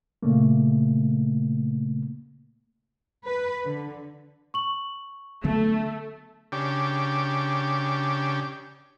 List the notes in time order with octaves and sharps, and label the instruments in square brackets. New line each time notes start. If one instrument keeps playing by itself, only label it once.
[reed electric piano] A#2 C#3 A3 A#3
[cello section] B4
D3
[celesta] C#6 F#7
[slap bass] D3 F#3 B3 [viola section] A3
[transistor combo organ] C#3 D4 G4